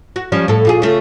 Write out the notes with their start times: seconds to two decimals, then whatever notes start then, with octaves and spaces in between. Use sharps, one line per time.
0.16 F#4
0.32 F3 G3 C#4
0.48 A2 A4
0.65 A#2 F4 G#4
0.82 C#3 A3 F4